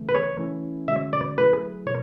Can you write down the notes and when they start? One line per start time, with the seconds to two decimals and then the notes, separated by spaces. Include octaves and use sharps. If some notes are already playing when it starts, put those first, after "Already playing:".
Already playing: C#3 E3 A3
0.09 B4
0.15 C#5
0.38 E3 A3 C#4 E4
0.88 D3 G#3 C#4 F#4 E5
1.13 D5
1.37 F#3 A3 E4 G#4 B4
1.86 B2 C#5